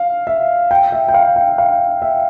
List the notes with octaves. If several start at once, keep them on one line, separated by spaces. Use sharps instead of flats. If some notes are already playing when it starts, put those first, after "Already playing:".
Already playing: F5
E5
G5
E5
G5
F5
G5
F5
E5